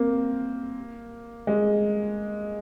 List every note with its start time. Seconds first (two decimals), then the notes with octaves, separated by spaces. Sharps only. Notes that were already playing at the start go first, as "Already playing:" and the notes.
Already playing: A#3 C4
1.47 G#3